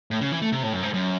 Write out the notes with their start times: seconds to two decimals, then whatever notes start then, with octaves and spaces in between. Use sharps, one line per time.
0.11 A2
0.21 C#3
0.32 E3
0.42 A3
0.52 C3
0.63 A2
0.73 F#2
0.83 G#2
0.94 F#2